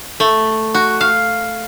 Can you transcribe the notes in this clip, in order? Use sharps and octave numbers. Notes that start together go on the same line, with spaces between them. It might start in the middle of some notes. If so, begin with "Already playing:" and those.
A3
F#4
F5